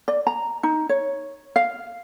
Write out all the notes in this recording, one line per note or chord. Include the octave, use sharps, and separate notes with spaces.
D5
A#5
D#4
C#5
F5